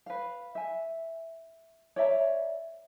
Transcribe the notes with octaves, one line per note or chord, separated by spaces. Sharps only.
B4 F5
E5 G#5
C#5 D5 E5 A#5